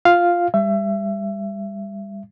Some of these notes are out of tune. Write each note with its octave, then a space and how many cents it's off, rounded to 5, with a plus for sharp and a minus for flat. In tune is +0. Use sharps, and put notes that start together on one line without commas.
F4 +0 F5 +0
G3 +30 E5 +30